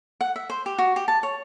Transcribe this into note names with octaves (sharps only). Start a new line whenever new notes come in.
F#5
E5
C5
G4
F#4
G4
A5
C#5